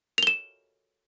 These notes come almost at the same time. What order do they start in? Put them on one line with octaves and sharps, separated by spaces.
F7 G7 E7